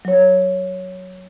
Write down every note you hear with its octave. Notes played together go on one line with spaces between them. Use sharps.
F#3 C#5